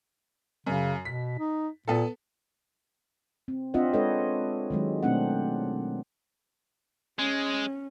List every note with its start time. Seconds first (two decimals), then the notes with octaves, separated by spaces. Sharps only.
0.66 F#2 C#3
1.05 B2 B6
1.39 D#4
1.88 A#2 B3 A4
3.48 C4
3.74 C4 D4 F4 D#5 E5 F#5
3.93 G#3 D4 A4 B4 C#5 D#5
4.70 D#3 F#3 G#3
5.03 B2 A3 C4 D4 F#5
7.19 G#3 C#4